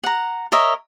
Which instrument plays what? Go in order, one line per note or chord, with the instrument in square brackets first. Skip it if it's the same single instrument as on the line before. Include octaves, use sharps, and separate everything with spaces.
[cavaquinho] F#5 A#5
A#4 C#5 D#5 E5